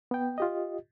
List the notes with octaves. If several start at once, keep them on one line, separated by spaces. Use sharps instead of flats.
B3 G5
F4 G4 D#5